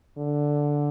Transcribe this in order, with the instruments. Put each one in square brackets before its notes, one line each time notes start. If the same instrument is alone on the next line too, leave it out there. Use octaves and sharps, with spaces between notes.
[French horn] D3